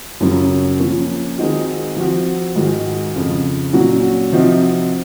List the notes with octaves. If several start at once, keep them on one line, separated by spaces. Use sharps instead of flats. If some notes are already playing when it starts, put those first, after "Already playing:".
F#2 C#3 F#3 C#4 F4
F3 A#3 C#4 F4
D#3 G#3 C4 D#4 F#4
F3 C4 F#4
G#2 D#3 G#3 D#4 F#4
F2 C#3 F3
A#2 F#3 C#4 F#4
C3 F3 C4 D#4 F#4